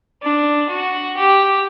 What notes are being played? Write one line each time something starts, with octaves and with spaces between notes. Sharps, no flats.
D4
F#4
G4